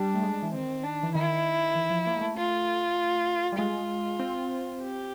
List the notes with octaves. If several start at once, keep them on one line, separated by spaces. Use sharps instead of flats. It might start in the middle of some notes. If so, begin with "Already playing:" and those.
Already playing: G3 D4
A3
G#3
E3
D#3 C4
D4
E3
D#3 E4
E3
F3
A#3
G#3
A3
F4
G3
G#3 F4
C4
G4